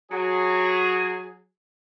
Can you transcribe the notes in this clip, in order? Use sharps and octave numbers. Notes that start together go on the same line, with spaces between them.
F#3 G#4